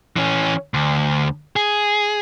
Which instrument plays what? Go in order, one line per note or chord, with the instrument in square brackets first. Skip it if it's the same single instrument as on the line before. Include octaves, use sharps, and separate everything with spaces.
[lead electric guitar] E3 C#4
D2
G#4